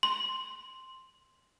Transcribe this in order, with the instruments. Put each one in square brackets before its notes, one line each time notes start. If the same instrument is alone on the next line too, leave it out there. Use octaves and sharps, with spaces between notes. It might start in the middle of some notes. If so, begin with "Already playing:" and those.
[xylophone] C6